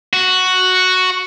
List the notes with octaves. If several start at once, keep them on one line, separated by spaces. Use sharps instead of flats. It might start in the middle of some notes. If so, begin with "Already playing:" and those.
F#4